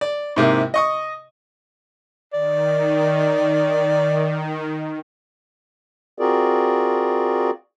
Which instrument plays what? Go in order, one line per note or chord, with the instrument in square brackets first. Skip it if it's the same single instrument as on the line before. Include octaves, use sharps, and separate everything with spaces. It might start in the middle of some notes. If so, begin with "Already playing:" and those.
[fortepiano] D5
G#2 C3 A#3 E4
D#5 C#6 D#6
[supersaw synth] D#3 [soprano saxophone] D5
[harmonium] C4 F4 F#4 G#4 A#4 D5